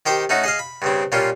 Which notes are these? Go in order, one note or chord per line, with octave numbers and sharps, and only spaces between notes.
D#3 G4 C5 D6
A3 C#4 D#4 F#4
G#4 D#5 F5
B5
G2 C#3 C4
A#2 G3 C#4 F4